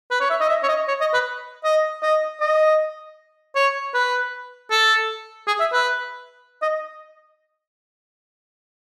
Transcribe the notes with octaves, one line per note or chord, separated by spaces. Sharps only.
B4
C#5
E5
D#5
E5
C#5
D#5
C#5
D#5
B4
D#5
D#5
D#5
C#5
B4
A4
G#4
E5
B4
D#5